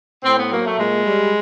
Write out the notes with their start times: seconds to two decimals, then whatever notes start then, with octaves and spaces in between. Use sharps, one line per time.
0.24 A2 C4
0.38 B3
0.51 F#3 A#3
0.65 A3
0.78 A#2 G#3
1.05 G3